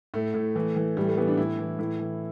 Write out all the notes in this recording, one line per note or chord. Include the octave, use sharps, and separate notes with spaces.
A2 A3
A2
E3
E3
A2 G3
A3
E3 B3
D4
A2 E4
E3
A2 E4
E3